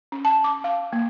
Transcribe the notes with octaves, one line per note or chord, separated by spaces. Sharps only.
C#4
A5
D6
F5
A#3